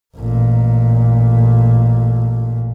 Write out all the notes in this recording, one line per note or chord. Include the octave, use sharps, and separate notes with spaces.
A1 A#2